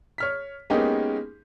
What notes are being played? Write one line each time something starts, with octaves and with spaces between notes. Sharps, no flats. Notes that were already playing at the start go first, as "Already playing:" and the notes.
C#5 F6 B6
G#3 A#3 B3 C#4 D#4 G4